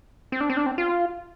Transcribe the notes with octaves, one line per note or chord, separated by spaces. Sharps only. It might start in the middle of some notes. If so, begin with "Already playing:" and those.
C4
D4
C4
D4
C4
F4